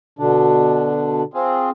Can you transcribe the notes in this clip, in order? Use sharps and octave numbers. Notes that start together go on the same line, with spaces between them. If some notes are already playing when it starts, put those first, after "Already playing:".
B2 D3 D4
C4 F4 G#4